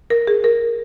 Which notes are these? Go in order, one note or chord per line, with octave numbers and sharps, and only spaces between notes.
A#4
G#4
A#4